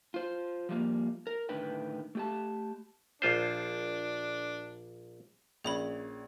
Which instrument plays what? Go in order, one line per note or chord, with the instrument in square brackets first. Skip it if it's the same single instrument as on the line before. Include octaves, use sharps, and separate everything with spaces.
[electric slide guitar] F4 C5
F3 G3 A#3
A#4
A2 D3 D#3 B4 G5
A3 G4 A5
[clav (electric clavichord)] A#1 F4 C5 [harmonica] D4
[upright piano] A#1 C#4 [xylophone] G#4 C#5 B5